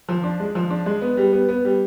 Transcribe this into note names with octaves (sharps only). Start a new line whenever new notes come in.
F3
D4
G#3
F3
D4
G#3
B3
G3
B3
B3
G3